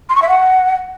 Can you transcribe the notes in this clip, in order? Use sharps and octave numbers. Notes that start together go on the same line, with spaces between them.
C6
C#6
E5
F#5